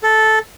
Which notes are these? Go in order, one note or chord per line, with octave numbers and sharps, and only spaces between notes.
A4